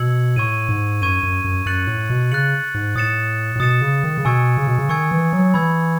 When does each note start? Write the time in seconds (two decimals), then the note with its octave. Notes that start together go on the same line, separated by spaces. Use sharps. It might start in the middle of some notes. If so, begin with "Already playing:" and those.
Already playing: B2 E6 G#6 C#7 F#7
0.36 A2 C#6 G#6 D#7
0.69 G#2
1.01 F#2 C#6 G#6 D#7
1.23 F#2
1.44 F#2
1.66 F#2 F#6 A6 C#7 F#7
1.87 A2
2.10 B2
2.32 C#3 F#6 A6 C#7 F#7
2.74 G#2
2.95 A2 D#6 A6 C#7 E7
3.56 A2
3.60 B2 D#6 A6 C#7 E7
3.82 C#3
4.04 D#3
4.18 C#3
4.25 B2 G#5 C#6 E6 G#6 C#7
4.57 C#3
4.67 B2
4.78 C#3
4.89 D#3 G#5 C#6 E6 G#6 C#7
5.11 E3
5.33 F#3
5.54 E3 B5 E6 G#6